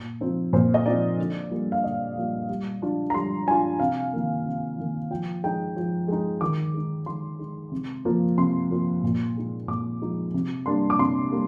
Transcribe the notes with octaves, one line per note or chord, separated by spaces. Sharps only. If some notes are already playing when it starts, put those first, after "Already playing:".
Already playing: A#2
F3 C4 D#4
A#2 C5
D#5
F3 C4 D#4 D5
D3
G3 A#3 F4
F5
D3 D#5
G3 A#3 F4
G3
D4 F4
A#5
G3 C6
D4 F4 G#5
C3 F5
D#3 A#3
C3
D#3 A#3
F3 G5
G#3 D#4 G5
F3
G#3 D#4
D#3 D6
G#3 D#4
D#3 C6
G#3 D#4
C3
F3 A#3
C3 C6
F3 A#3
A#2
F3 G#3 D#4
A#2 D6
F3 G#3 D#4
C3
G3 A#3 D4 C6
D6
C3 C6
G3 A#3